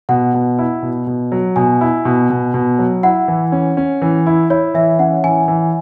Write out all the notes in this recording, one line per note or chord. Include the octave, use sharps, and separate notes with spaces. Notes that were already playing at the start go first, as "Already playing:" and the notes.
B2 F#5
B2
E4
B2
B2
F#3
B2 G#5
E4
B2
B2
B2
F#3
E4 F#5
E3
C#4
C#4
E3
E4
E4 C#5
E3 E5
C#4 F#5
E3 G#5
E3